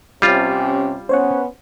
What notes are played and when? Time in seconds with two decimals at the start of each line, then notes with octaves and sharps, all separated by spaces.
0.22 C3 G3 C#4 F4
1.09 B3 C#4 C5 C#5 F#5